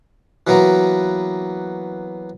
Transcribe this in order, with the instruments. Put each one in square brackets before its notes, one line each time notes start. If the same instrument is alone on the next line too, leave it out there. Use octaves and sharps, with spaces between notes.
[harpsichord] E3 F#3 A#3 B3 A#5